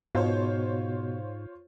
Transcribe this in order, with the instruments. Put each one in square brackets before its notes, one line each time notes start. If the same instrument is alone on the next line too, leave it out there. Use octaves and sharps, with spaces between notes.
[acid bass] G#2 [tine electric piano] B2 [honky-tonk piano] F4 C5 C#5